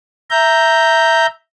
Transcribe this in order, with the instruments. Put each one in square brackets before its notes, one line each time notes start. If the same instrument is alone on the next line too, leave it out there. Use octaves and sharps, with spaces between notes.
[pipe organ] E5 A#5 G6